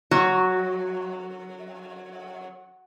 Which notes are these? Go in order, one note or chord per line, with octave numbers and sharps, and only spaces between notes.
F#3 F#4